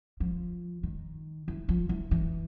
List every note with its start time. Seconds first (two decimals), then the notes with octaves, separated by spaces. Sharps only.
0.20 F3
0.83 D#3
1.48 E3
1.69 F3
1.89 E3
2.11 E3